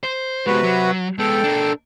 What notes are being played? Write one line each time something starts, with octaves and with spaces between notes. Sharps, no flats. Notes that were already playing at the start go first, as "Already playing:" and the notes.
C5
C3 G#3 B3 F#4 B4
F#3
G#3 B3 A4 G5
D4 A#4